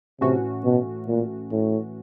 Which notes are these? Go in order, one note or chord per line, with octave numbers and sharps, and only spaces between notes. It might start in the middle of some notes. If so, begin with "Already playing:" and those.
A2 C3 E3 A3 C#4 F#4
B2
A#2
A2